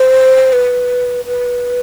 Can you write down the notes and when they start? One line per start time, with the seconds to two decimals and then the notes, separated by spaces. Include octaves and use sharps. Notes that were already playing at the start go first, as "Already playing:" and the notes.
Already playing: C5
0.53 B4
1.25 B4